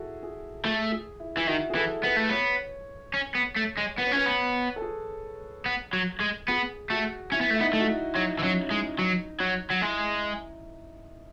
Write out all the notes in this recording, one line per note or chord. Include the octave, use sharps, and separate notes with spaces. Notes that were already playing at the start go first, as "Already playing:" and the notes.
Already playing: E4 F#4 G#4 A4
G#4
A3 G#4
G#4
E4
E3 E4
D#3 F#4
G#4
E3 A4
B3 B4
A3
B3 C#5
C#4
B3
A3
G#3
B3 B4
C#5
C#4 B4
B3
A4
G#4
B3
F#3
G#3
B3 G#4
A3 F#4
C#4 E4
B3
A3
E4
B3 D#4
A3
F#4
E4
F#3 D#4
E3
F#3 C#4
E4
G#3 D#4
F#3
F#3
F#3
G#3 E4